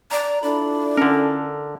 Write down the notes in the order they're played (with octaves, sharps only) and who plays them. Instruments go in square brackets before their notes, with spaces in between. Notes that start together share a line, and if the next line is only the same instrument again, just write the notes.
[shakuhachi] D5 [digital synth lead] A#5
[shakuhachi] D4 [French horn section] E4 F4 A4 [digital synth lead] B5
[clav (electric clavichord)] D3 A#4 [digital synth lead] C#4